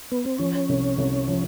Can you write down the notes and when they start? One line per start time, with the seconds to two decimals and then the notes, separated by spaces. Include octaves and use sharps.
0.12 B3
0.26 C4
0.39 F3 C#4
0.69 C2
0.98 C2
1.28 F3